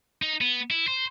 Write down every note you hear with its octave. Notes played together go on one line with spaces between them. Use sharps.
D#4
B3
E4
C5